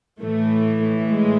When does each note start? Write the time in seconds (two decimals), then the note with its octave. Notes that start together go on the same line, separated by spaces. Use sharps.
0.21 A2 E3 A3
1.08 G#3